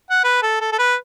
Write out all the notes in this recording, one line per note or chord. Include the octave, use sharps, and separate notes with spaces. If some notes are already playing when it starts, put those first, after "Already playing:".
F#5
B4
A4
A4
A4
B4